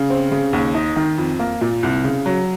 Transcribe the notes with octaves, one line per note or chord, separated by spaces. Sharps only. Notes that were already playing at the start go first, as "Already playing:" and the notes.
Already playing: C#3
C4
C#3
D#2
D#4
D#3
F2
A#3
A#2
C2
C#3
F#3